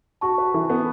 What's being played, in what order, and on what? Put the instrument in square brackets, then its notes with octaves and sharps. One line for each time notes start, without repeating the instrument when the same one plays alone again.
[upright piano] F#4 [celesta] A5 C#6
[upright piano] B4
E3
B3